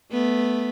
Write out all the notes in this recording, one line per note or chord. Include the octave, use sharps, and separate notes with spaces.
A3 B3